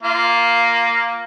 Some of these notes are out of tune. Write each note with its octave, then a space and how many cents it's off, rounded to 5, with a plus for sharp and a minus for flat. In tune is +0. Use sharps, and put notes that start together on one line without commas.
A#3 +0 F4 +0